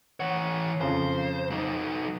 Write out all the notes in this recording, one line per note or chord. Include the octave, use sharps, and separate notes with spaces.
E3 C#5 F#5
F2 C#3 C5
F#3 D#4